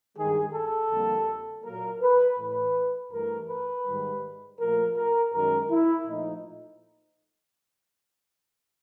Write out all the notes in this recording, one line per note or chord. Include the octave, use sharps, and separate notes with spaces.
G2 D#3 G#3 G#4
A4
F2 D3 G3 A#3
A#2 F#3 A#3 A#4
B4
A2 E3 A3 B4
G2 E3 A3 A#4
B4
G#2 D#3 G3
A#2 F3 A3 A#4
A#4
F#2 D#3 G#3 A#4
E4
A#2 F3 A3 D#4